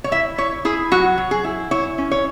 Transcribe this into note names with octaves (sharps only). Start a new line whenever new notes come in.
C#5
E4 E5
E4 C#5
E4 G#4
F#3 F#4
F#3
G#4
E4
E4 C#5
C#4
C#5